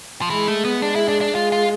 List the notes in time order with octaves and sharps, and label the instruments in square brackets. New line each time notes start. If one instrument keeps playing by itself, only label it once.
[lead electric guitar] F3
[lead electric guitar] E3 [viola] G#3
[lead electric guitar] A3
B3
[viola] G#3 [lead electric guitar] D4
[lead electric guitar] E4
D4
D4
[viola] G#3 [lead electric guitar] F4
[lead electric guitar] F4